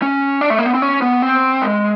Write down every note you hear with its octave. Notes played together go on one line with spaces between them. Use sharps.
C#4
D4
A3
A#3
B3
C4
C#4
B3
C4
G#3